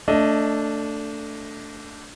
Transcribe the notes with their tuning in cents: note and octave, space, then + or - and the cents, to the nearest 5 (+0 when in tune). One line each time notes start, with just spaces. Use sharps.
A3 +15 D4 -15 D#5 +0